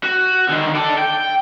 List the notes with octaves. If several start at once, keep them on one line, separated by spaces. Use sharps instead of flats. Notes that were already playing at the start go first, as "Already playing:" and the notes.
F#4
D3 D#3
A4 D5
G5